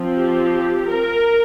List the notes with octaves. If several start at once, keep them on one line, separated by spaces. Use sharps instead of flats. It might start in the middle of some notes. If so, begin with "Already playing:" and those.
Already playing: F3 C4
G4
A#4